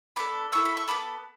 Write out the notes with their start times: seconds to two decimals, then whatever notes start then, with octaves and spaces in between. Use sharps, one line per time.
0.16 B3 D4 A4 B5 D6
0.52 B3 E4 A4 C#6 E6
0.65 B5
0.77 C#6
0.88 B3 E4 A4 B5 D6